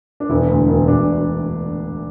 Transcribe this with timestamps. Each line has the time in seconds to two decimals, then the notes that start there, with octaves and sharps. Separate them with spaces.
0.20 D4
0.30 E1 E4
0.50 D2
0.68 E1
0.87 E1 D4